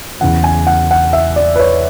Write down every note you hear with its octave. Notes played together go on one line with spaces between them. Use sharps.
E2 C#3 E3 F#5
G#5
F#5
F#5
E5
D5
B4
C#5